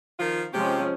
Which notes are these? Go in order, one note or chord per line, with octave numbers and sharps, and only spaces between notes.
D#3 F3 F4
C3 F3 G#3 C#4 G4